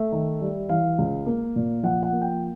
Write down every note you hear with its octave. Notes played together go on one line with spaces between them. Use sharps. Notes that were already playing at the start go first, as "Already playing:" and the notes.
Already playing: A3 E5
D#3
G3
E3 F5
C#2
A#3
A#2
F3 F#5
F#5
A#3
G5